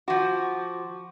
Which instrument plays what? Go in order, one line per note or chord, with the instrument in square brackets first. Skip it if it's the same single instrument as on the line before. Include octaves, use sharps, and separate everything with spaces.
[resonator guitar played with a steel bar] F3 F#4 [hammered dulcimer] D6